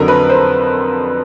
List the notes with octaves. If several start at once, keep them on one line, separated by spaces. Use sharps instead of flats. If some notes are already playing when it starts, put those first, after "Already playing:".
Already playing: F2 D3 F#3 A#4
B4
C5